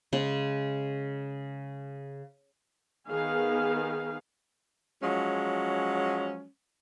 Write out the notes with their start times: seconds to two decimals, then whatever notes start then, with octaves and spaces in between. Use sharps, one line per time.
0.13 C#3 G#3
3.10 D#3 B3 G#4 F5
5.01 F3 F#3 G#3 C#4